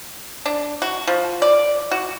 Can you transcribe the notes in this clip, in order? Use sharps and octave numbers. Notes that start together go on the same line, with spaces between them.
D4
F#4
F3
D5
F#4